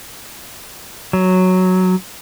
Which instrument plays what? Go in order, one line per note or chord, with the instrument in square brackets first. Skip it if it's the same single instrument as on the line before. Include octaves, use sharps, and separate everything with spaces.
[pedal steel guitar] F#3